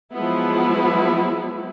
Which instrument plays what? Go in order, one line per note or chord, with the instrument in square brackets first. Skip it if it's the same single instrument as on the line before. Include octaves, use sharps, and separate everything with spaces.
[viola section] F3 F#3 G#3 B3 E4